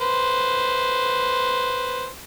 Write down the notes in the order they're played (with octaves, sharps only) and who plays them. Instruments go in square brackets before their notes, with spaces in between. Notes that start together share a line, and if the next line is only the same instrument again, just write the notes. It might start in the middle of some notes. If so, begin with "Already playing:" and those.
[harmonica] B4 C5